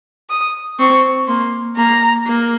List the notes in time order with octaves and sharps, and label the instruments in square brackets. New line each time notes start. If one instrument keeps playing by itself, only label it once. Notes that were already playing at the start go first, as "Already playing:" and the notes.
[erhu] D#6
[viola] C4 [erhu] C#6
[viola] A#3 [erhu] C6
[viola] A#3 [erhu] A#5
[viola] A#3